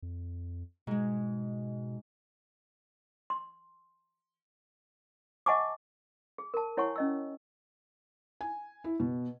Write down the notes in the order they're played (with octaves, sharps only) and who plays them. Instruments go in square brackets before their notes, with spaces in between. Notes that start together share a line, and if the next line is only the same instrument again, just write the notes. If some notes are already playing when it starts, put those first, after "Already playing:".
[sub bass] F2
[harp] G#2 G#3 [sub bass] B2
[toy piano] C6
D#5 F#5 G#5 A5 C#6 D6
G#4
A#4 A5
E4 C#5 F#5 G#5 C#6
C#4 D#5 E6
[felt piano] G#5
E4
B2